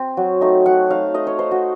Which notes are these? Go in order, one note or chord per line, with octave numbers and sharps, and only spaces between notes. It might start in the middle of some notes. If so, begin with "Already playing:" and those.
Already playing: C4
F#3
A3 D#4
F#3 F#5
A3 D#4 F5
A3 D#5
C#5
D#4 C5
F#4